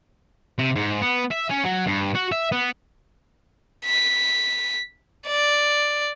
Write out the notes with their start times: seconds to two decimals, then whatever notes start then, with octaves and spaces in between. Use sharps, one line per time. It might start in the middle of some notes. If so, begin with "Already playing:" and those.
0.58 C3
0.75 G#2
1.02 B3
1.31 E5
1.50 C#4
1.64 F#3
1.87 G2
2.15 F#4
2.32 E5
2.52 B3
3.86 B6
5.27 D5